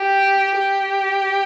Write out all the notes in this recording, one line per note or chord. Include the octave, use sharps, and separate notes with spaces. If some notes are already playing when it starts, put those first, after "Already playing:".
Already playing: G4
G4